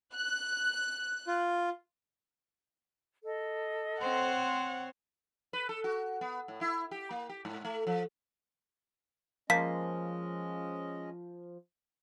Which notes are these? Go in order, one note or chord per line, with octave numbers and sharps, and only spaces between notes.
F#6
F4
A4 D#5
C4 C5 C#5 F#5
B4
A4
F#4
B3
A2
E4
G4
A#3
G4
G#2
A3
F3
F3 G#3 A#3 C#4 D#5 B6